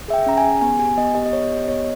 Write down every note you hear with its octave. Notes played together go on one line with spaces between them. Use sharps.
G#4 E5
G5
C#4 A#5
G#5
G#4
B3 G#5
G4 G#5
B3 D#5
G4 D#5
D#5
B3 C#5
G4
D#5
B3 C#5